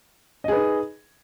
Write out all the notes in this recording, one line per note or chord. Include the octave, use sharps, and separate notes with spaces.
D#4 G#4 B4 D#5